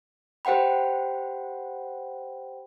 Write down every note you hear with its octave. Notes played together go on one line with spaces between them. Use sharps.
G4 C5 F#5 G5 B5